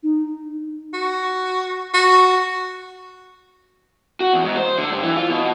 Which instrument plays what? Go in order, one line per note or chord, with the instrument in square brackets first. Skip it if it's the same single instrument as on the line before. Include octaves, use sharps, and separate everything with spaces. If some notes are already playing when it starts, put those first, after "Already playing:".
[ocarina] D#4
[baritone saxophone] F#4
F#4
[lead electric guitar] F#4
E2
G#2
C5
D3
G2
E3
F4
B2